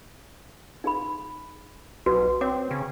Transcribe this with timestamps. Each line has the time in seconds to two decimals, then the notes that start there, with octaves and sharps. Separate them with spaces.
0.84 D#4 G#4 B5
2.06 B1 F#4 B4
2.41 C4 C#5 D6
2.71 C#3